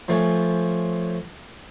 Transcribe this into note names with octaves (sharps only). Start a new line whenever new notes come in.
F3 A3 C#4